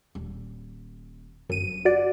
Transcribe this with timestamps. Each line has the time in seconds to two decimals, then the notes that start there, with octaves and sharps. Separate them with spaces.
0.15 D#1
1.49 G1 F#2 D#7
1.85 F#4 D5